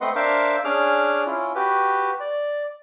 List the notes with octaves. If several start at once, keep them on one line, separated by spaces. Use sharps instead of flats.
A3 C4 B4 D#5 F#5 C6
D4 A#4 C5 E5 F5 D6
C#4 D4 G#4 D6 F6
C#4 E4 F4
F#4 G4 B4
D5